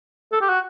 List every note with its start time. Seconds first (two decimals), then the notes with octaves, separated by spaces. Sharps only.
0.32 A4
0.41 G4
0.49 F#4